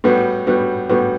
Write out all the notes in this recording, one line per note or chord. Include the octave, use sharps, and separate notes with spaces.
A2 G3 B3 F#4
A2 G3 B3 F#4
A2 G3 B3 F#4